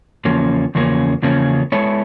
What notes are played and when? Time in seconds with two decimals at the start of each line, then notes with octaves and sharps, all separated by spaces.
0.25 E2 C#3 F3 A#3 C#4
0.75 E2 C#3 F3 A#3 C#4
1.22 E2 C#3 F3 A#3 C#4
1.72 G#3 B3 E4 A4 C#5